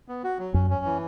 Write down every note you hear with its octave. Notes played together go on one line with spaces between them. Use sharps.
B3
F#4
F#3
F#2 C#4
C#4
E3